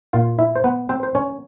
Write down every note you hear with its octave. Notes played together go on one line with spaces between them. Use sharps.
A#2 F4 F5
E4 E5
C5
B3 B4
C4 C5
C5
C#4 C#5